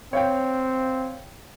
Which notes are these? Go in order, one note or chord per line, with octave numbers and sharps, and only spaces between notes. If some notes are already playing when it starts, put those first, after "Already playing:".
C4 C#5 F5 G5